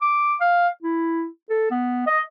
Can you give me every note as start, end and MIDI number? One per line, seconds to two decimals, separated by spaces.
0.01 0.35 86
0.40 0.68 77
0.83 1.26 64
1.50 1.67 69
1.71 2.04 59
2.07 2.20 75